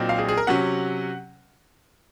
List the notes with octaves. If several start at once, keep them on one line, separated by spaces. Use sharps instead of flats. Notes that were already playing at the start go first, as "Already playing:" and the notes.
Already playing: A#2 F#3 C4 D#4
F5
G#4
G#4
A#4
C3 F#3 C#4 F#5